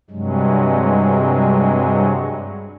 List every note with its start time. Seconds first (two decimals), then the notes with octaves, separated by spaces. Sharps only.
0.10 G2 C3 F#3 G#3